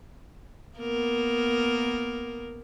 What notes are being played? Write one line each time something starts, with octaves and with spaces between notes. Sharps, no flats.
A#3 B3 A#4